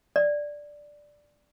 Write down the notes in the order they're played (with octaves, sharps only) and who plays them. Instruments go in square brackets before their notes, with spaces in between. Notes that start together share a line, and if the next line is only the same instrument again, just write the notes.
[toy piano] D5